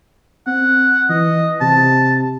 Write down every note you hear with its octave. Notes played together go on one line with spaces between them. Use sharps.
C4 F#5
E3 D#5
C3 A5